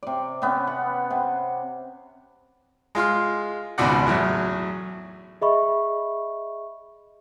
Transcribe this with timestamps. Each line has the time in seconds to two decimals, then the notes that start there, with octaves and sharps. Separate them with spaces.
0.03 C3 D5
0.42 C3 B3 C#4
0.67 F#5
1.10 C3
2.95 G#3 F4 C6 F6
3.78 G#1 C#2 B2 D5 F#5
4.06 E2 A2 F#3
5.42 G#4 D#5 E5 B5 C#6